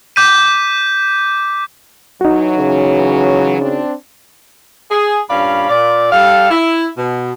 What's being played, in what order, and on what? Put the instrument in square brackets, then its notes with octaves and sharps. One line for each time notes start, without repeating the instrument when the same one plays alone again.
[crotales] D6 G6 B6 D#7
[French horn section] E3 F#3 [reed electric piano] D#4 F#4
[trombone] C#3
[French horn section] C4 D4
[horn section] G#4
G2 A#2 C#4 D5 F5 B5
A#2 D5
G3 A4 F5
E4
B2